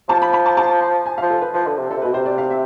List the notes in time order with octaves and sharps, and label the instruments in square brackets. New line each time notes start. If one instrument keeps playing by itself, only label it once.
[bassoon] F3 [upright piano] A5
[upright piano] B5
B5
A5
A5
G#5
F5
[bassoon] F3
[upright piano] A4
B4
[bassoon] F3 [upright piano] B4
[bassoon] D3
C3
[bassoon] D3 [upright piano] A4
[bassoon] C3
[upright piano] B4
[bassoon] B2
[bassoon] C3 [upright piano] C5
[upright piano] D5
F5
E5